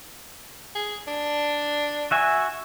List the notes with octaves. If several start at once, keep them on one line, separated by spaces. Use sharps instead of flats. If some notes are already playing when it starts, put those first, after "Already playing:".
G#4
D4
F#4 E5 G#5